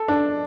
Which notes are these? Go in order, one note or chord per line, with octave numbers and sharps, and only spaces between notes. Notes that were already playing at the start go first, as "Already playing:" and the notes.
Already playing: A4
D4